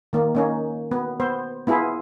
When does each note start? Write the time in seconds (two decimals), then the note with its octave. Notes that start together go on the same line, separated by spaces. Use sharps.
0.13 D#3 A#3
0.35 A#3 C#4 D#4
0.91 B3
1.20 B3 C5
1.67 B3 E4 F4 G#4